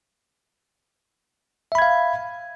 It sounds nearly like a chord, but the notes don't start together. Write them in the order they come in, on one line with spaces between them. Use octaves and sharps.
E5 B5 G#6 F5